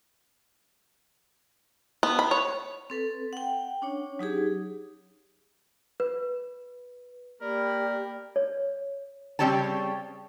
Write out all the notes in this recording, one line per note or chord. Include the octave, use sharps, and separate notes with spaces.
B3
B5
C#5
C4 A4 B4
F#5 G5
C#4 D4 C#5
F#3 D#4 G4 G#4
B4
A#3 G4 A#4 D5 B5
C#5
C#3 G3 C4 G4 C#5 A5